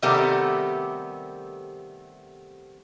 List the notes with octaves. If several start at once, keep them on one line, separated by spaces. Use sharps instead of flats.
C3 D#3 G3 A3 B3 C4